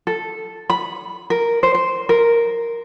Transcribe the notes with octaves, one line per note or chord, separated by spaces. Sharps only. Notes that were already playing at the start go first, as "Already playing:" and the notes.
A4
B5
A#4
C5
C5
A#4